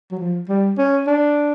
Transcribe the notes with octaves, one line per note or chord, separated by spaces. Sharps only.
F#3
F3
G3
C#4
D4